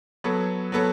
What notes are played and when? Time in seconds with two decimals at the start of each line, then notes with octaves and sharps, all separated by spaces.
0.24 F#3 B3 A4 C#5
0.72 F#3 B3 A4 C#5